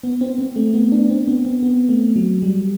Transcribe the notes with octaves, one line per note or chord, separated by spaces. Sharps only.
B3
C4
C4
A3
B3
D4
C4
B3
C4
B3
A3
F#3
G3